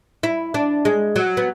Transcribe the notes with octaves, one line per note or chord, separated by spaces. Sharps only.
E4
D4
G#3
F#3
B3